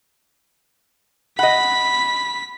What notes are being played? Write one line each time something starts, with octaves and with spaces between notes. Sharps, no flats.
D#5 F#5 B5 B6